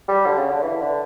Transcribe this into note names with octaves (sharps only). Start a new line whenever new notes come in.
G3
D3
C#3
D3
E3
D3